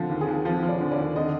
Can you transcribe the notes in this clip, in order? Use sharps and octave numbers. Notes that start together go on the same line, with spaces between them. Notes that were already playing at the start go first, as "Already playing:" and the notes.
Already playing: D3 F3
D#2
G#4
D#2
F3
F3
D5
D3
D5
D#2
D3 D#5